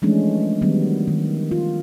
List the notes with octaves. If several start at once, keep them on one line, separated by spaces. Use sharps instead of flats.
E3 F3 G#3 A3 C#4 D4
D#3 F#3 G3 B3
D#3
F4